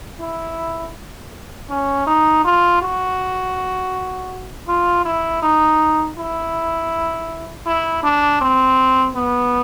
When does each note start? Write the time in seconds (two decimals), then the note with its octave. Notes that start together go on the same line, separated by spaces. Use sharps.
0.20 E4
1.69 C#4
2.07 D#4
2.44 F4
2.81 F#4
4.68 F4
5.05 E4
5.42 D#4
6.17 E4
7.66 E4
8.03 D4
8.41 C4
9.15 B3